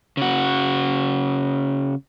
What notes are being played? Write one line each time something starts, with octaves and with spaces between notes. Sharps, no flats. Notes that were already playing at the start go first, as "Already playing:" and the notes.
C#3 F#4